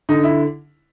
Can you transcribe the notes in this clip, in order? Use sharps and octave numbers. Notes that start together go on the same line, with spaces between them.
D3 D#4
E4